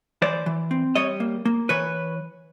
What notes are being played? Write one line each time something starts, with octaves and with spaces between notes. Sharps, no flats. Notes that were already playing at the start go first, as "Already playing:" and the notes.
E3 C5 D5
E3
C4
G3 C#5 D#5
A#3
A#3
E3 B4 C#5